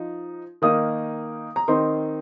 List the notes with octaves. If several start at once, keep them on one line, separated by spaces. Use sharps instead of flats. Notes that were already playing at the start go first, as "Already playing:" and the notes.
Already playing: F3 D#4
D#3 A#3 D#4 D#6
A#5
D#3 C4 D#4 C6